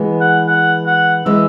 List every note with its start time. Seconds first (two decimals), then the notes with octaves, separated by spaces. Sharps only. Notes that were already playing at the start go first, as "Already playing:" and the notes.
Already playing: E3 G#3 B3
0.21 F#5
0.47 F#5
0.86 F#5
1.26 E3 G#3 E5